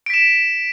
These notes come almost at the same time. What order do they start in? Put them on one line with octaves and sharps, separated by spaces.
D7 B6 E7